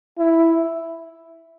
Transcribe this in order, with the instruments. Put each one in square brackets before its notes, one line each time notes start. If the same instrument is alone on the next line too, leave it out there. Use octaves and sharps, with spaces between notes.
[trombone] E4